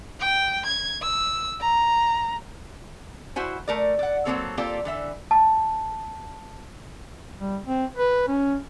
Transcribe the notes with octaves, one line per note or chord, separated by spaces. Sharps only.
G5
G#6
E6
A#5
E4 F#4 C5 G#5
A3 A#4 D5
D5 F#5
F#3 G#3 A#3 C4 A4 C#5
A#3 C4 F4 G4 A4 D5
D3 E3 E5
A5
G3
C4
B4
C#4